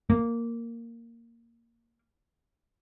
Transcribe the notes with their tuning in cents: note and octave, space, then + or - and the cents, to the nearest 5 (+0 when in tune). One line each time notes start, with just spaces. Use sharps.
A#3 -10